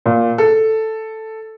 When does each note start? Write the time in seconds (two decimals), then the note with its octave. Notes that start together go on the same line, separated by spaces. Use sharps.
0.06 A#2
0.38 A4